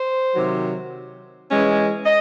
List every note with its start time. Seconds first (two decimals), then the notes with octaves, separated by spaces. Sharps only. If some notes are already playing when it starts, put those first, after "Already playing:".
Already playing: C5
0.35 C3 D#3 F#3
1.49 E3 G#3 C#4
2.05 D#5